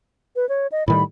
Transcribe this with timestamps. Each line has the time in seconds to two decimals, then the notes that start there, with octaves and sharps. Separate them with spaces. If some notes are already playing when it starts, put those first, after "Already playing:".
0.36 B4
0.49 C#5
0.72 D#5
0.88 A2 D#3 G3 B5